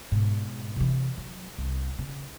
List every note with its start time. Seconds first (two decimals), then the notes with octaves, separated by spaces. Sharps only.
0.11 G#2 B2
0.76 C3 E3
1.17 F#3
1.58 C2
1.98 C#3